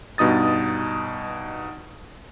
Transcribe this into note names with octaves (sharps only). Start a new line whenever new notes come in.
G2 B2 D#4 D#6 A6